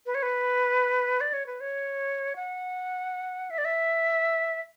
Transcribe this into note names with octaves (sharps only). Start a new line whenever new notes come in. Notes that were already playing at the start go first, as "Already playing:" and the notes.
B4
C#5
B4
D5
C#5
B4
C#5
F#5
E5
D5
E5